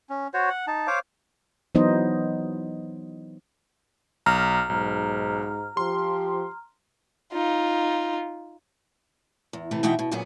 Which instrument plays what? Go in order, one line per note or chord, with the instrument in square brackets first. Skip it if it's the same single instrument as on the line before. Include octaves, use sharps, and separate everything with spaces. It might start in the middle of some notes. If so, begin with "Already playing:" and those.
[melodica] C#4
F#4 C5 C#5
F#5
D#4 A5
C5 C#5 F5 D6
[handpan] E3 F#3 B3 D#4 C5 D#5
[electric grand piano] B1 [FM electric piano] A#5 F6
[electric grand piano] B1 [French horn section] G#2
[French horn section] F3 G4 [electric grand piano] C6
[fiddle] D#4 F4
[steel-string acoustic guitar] E2
C3 E3 A3
B2 E3 B3 D#4 E5 G5
B2
F#2 A#2 D3 F#3 B3 G#4